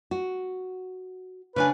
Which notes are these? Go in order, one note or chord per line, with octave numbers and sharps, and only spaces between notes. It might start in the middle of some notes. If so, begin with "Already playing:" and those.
F#4
C#3 D4 B4 G#5